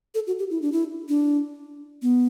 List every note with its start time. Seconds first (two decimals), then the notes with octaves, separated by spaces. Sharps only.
0.15 A4
0.27 F#4
0.39 G4
0.50 E4
0.62 D4
0.72 E4
1.09 D4
2.02 B3